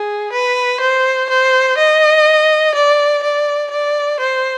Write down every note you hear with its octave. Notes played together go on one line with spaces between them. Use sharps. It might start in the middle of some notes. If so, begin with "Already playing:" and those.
Already playing: G#4
B4
C5
C5
D#5
D5
D5
D5
C5